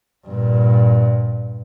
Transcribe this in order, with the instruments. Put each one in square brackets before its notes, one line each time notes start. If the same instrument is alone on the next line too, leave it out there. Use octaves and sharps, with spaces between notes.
[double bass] G2 A#2